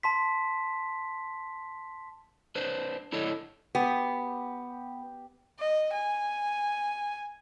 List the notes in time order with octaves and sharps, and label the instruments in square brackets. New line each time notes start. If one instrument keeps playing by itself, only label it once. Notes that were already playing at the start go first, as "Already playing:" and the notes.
[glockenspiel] A5 C6 B6
[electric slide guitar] D4 B4 C5
D4 E4 A4 C#5 D#5
[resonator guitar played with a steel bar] B3 [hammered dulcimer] G4
[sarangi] D#5
G#5